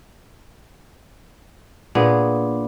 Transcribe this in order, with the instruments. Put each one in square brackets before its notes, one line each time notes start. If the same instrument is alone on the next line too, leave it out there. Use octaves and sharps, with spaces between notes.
[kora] A#2 B3 G#4 [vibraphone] D4